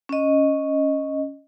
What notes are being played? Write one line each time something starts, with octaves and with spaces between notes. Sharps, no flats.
C#4 D#5